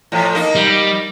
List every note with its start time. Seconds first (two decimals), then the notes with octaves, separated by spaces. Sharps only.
0.12 A2 F3
0.35 A#3 D#4
0.55 G3